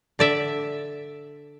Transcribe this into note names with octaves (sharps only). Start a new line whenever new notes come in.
D3 D5 E5